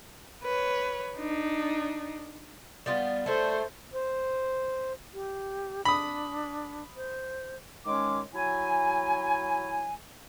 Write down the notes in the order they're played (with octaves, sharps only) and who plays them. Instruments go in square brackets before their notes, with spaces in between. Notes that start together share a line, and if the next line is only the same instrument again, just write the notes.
[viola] B4 C#5
D4 D#4
[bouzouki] G3 B3 F4 [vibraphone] D5
[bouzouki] A3 E4 [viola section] A4 C5
[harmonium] C5
[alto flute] G4
[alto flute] D4 [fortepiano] B5 D#6
[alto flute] C5
[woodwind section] D#3 G#3 C#4 C#5 D6
F#3 E4 G#5